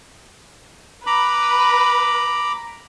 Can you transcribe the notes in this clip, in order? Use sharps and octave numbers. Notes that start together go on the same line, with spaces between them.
B4 A#5 B5 D6